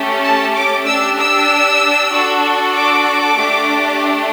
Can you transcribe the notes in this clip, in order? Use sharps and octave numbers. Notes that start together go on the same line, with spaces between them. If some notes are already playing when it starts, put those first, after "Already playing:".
Already playing: A3 C#4 G4
A5
D6
D4 G4 E6
E6
D4 F#4 A4
D6
A3 D4 G4